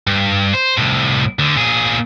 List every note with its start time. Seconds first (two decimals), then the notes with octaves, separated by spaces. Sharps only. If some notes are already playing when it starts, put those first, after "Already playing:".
0.07 G2
0.54 C5
0.77 C2 A2
1.39 D2 D3
1.55 A#2 G#4